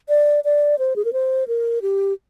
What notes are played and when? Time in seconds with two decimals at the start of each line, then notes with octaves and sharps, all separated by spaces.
0.09 D5
0.45 D5
0.79 C5
0.96 G#4
1.05 A#4
1.13 C5
1.48 A#4
1.82 G4